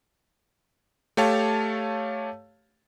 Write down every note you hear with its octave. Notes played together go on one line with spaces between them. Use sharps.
A3 G4 C#5 F5 A5